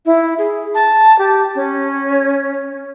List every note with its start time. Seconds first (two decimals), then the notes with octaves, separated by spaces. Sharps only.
0.06 E4
0.38 G#4
0.75 A5
1.19 G4
1.55 C#4